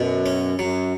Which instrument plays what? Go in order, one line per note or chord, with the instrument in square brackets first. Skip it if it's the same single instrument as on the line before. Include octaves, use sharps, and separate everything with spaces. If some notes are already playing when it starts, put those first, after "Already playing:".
Already playing: [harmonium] F#2 [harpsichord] B2
[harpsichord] C#4
[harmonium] F#2 [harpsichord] F#3